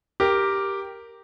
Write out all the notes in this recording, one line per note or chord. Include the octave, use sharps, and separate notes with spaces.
G4 A#4